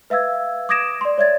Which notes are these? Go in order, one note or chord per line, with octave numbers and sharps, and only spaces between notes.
B4 E5 F5 E6 G#6
D6 D#6 G#6 A#6 D7 E7
D5 C6
C#5 D5 E5 G#6 A6